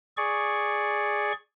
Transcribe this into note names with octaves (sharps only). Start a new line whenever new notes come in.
G#4 D5 C#6